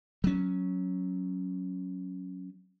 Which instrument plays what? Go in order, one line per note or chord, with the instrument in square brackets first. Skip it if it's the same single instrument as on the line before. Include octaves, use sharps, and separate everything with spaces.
[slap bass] F#3 C#4